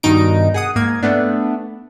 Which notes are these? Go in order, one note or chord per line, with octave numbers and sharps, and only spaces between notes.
G2 B2 D#3 D#4 D7
G#4 F#5 D#6
G#2 A#3 G#6
A3 B3 D4